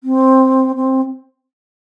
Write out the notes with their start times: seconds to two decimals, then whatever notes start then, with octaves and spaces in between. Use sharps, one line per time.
0.04 C4
0.76 C4